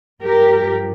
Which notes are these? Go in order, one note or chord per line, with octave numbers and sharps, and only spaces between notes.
G2 F3 G4 A#4